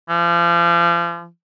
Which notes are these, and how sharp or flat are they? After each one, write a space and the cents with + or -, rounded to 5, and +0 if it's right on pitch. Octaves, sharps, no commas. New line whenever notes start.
F3 -35